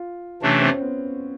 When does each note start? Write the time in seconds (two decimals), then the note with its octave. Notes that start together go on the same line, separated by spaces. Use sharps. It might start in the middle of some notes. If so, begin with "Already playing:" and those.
Already playing: F4
0.42 C3 E3 A3 C#4 D4
0.62 C4
0.72 C4
0.81 B3